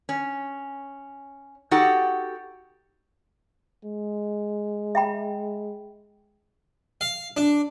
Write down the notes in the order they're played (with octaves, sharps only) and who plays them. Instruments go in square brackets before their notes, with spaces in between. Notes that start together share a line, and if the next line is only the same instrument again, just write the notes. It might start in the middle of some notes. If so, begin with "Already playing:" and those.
[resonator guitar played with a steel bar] C#4
D#4 F#4 G4 A4 F#5
[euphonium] G#3
[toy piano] E5 G5 B5
[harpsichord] F5
D4